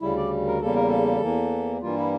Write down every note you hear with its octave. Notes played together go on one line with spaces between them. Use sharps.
D2 C#3 G3 E4
D5
A#4
E2 C#3 G3 A#3 A4
A#4
A4
E2 E3 A#3
G2 E3 G3 A#3 F4
E4